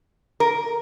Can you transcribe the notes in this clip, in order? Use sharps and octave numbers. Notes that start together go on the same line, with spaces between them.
A#4